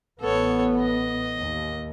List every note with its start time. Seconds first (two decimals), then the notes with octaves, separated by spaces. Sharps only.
0.20 A1 B3 A4 C#5
0.79 D#5
1.39 D#2